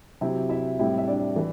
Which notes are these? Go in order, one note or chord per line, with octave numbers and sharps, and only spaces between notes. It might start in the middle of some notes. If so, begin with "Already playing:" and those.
C3 F#3 C4 E4
E4 E5
A2 G3 C4 E4
E5
D4 D5
E3